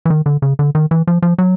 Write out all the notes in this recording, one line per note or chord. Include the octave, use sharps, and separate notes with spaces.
E3
D#3
D3
C#3
D3
D#3
E3
F3
F3
F#3